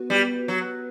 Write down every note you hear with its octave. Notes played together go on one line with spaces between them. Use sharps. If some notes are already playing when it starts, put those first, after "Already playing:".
Already playing: B3 F#4 B4
G3
F#3